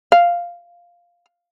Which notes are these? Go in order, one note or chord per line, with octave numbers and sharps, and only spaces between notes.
F5